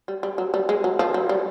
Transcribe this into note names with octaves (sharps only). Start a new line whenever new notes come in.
G3
G3
F#3
G3
G#3
F#3
F3
F#3
G3